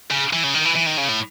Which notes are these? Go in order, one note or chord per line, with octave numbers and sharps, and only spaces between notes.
C#3
E3
C#3
D#3
E3
E3
D#3
C#3
A2